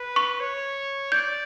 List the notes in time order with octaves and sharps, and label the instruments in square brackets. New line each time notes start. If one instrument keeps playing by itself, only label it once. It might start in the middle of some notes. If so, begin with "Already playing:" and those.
Already playing: [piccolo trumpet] B4
[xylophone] C#6
[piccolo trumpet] C#5
[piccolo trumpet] D5 [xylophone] G6